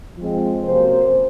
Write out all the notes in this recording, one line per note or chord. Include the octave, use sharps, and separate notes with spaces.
F3 G#3 C4
C3 F#3 A#3 C#4 C5